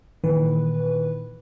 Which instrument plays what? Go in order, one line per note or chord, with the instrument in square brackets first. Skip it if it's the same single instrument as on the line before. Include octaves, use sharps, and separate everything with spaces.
[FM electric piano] A#2 D#3 E3 B4